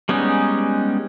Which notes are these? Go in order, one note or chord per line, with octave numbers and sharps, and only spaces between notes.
G3 G#3 B3 C#4 D#4